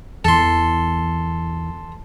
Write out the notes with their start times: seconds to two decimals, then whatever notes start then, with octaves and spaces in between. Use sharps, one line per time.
0.25 E2 E3 A4 C6